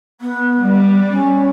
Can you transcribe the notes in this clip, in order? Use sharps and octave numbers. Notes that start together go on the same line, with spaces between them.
B3
G3
C#4